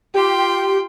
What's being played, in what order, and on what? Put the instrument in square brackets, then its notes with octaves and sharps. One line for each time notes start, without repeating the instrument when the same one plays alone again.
[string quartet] F4 G5 C6 [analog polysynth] G4